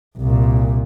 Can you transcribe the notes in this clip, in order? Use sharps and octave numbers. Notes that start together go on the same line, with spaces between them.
C2 A#2